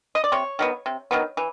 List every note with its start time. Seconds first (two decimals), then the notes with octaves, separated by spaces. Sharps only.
0.15 D#5
0.24 D5
0.32 C3 C#5
0.59 D#3 F#3 B3
0.86 C3
1.11 D#3 F#3 B3
1.37 E3